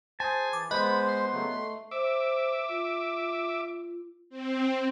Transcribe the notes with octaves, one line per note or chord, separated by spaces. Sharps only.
G#4 C5 G#5 A5
E3 D6
G#3 B3 B4 C5 D#5 B5
C6
C#3 F#3 A3
A3
C5 E5 D6
F4
C4